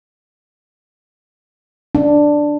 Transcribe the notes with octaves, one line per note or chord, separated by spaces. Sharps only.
D4